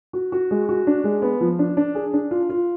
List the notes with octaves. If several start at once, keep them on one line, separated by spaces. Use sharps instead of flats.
F#4
F#4
G#3
F#4
D4
G#3
B3
F3
D4
D4
G#4
D4
F4
F4